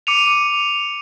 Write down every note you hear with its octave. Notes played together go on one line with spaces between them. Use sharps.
D6 C#7 D#7 F7